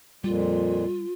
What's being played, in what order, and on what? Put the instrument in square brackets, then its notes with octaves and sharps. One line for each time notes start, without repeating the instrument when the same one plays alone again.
[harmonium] F2 A#2 [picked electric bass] G3 [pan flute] F4